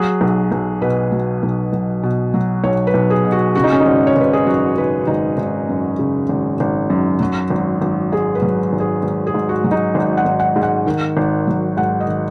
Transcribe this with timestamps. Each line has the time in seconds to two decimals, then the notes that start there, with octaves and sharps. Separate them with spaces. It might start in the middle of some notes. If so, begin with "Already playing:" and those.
Already playing: F#3 G#4
0.21 B1
0.52 B1
0.81 B2 B4
1.12 F#3
1.43 B1
1.73 B1
2.03 B2
2.34 F#3
2.64 B1 C#5
2.87 B4
2.94 B1
3.10 G#4
3.25 B2
3.32 F#4
3.55 C#3 F#4
3.64 D#4
3.72 C#4
3.80 D#4
3.86 G#1
4.07 C#5
4.17 G#1 B4
4.33 G#4
4.46 F#2 F#4
4.77 C#3 B4
5.07 G#1 D#4
5.38 G#1
5.69 F#2
5.99 C#3
6.29 G#1
6.60 G#1
6.90 F#2
7.20 F#3
7.50 G#1
7.82 G#1
8.12 G#2 G#4
8.35 B4
8.42 F#3
8.73 G#1
8.80 G#4
9.03 G#1
9.27 G#4
9.34 G#2
9.49 F#4
9.64 F#3
9.71 D#4
9.95 G#1
10.17 F#5
10.25 G#1
10.40 F#5
10.56 G#2
10.63 F#5
10.86 D#3
11.17 G#1
11.47 F#3
11.77 G#2 F#5
12.00 D#5
12.07 D#3